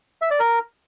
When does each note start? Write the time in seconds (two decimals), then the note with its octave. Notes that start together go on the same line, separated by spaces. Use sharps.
0.22 E5
0.31 D5
0.40 A#4